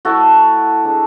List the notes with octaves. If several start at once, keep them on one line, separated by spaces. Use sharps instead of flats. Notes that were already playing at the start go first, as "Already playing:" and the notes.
A3 E4 F#4 A4
G#3 D4